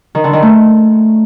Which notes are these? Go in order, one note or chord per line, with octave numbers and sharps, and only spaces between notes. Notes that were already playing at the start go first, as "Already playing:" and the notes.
D#3
D3
D#3
A3